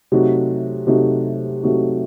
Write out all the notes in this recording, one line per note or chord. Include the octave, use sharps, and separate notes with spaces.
C3 F#3 A3 D#4 F#4
C3 F#3 A3 D#4 F#4
C3 F#3 A3 D#4 F#4